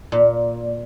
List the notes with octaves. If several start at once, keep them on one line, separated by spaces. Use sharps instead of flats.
A#2